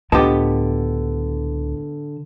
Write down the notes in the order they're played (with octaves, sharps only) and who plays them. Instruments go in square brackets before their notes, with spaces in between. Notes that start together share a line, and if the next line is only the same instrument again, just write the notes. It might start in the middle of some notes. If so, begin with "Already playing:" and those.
[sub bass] C#2 [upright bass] A2 [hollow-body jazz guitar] D3 D#5 A5 [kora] B3 F4 G4